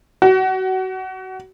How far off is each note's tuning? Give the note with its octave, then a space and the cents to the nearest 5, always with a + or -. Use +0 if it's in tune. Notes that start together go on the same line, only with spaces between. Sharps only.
F#4 +30